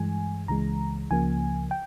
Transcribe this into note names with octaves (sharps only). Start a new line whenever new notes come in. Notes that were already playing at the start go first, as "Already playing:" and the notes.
Already playing: G2 E3 G#3 G#5
C#2 C#3 E3 G#3 A#5
C#2 C#3 F3 A#3 G#5
G5